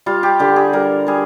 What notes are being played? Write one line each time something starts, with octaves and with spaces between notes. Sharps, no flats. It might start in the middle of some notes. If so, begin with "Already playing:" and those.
G3 F4
G4
D3 G4
G#4
G3 A#4
G3 G#4